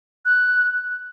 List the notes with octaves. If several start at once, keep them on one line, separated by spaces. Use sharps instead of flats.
F#6